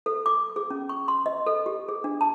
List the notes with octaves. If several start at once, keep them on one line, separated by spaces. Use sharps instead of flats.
A4
D6
G#4
C#4
C#6
C6
D#5
A4
G4
G#4
D4
A5